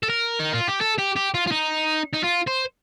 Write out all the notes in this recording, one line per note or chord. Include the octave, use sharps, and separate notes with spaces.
A4
A#4
D#4
F4
G4
A4
G4
G4
F4
F4
D#4
D#4
F4
C5